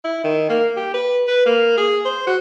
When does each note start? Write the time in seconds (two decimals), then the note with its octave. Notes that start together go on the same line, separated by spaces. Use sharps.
0.04 E4
0.24 D#3
0.49 A#3
0.76 G4
0.94 B4
1.27 B4
1.46 A#3
1.77 G#4
2.05 C5
2.27 F#4